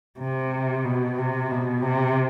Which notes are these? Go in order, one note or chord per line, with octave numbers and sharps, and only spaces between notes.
C3
B2
C3
B2
C3